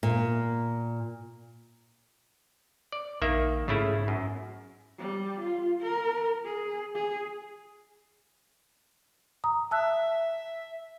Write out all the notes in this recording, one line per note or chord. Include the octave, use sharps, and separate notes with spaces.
A#2
D5
A#1 D#3 A#3 E5
G#2 C#3 A3 E4
F#2
G3
F4
A#4
G#4
G#4
A#5 D#6
E5 A5 E6 F#6